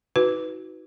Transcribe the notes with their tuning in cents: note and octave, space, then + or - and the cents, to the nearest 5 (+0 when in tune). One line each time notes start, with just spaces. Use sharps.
D#4 +40 F#4 +0 B4 +0